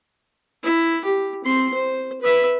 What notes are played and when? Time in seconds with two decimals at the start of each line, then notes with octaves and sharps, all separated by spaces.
0.63 E4
1.05 G4
1.45 C4 C6
1.74 C5
2.21 B4 E5